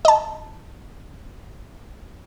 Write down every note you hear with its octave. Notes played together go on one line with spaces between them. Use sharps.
D#5 A5